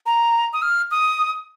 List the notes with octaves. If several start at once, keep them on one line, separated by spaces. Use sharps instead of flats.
A#5
D#6
F6
D#6